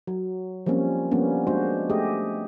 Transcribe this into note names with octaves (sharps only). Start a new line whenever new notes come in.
F#3
F3 G3 A#3 C4 C#4
F3 G3 A#3 B3 C#4 D4
G#3 D4 F#4 C5
A3 G4 G#4 D#5